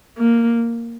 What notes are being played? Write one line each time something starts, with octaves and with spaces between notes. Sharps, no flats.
A#3